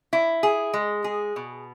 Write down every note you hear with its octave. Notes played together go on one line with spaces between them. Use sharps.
E4
G#4
G#3
G#4
B2